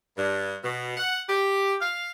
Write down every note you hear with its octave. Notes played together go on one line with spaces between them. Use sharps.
G2
B2
F#5
G4
F5